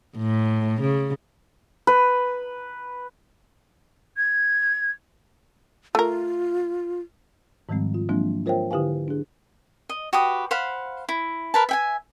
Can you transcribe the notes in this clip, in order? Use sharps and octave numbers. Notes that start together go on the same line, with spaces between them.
A2
C#3
B4
G#6
A3 F4 A#4
G#2 D#3 F3 G3 G#3 C4
F4
F3 F#3 G#3 A#3 C4 D4
F4 A#4 C5 C#5 E5 G5
D3 E4 G4 B4 F5 G#5
D4 G#4
D#5
F#4 G4 B4 D#6
C5 F5 F#5 B5
E4
A#4 B4 A5
E5 G5 G#5